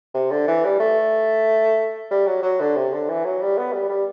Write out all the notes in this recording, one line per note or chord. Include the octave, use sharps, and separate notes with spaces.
C3
D3
E3
G3
A3
G3
F#3
F#3
D3
C3
D3
E3
F#3
G3
B3
G3
G3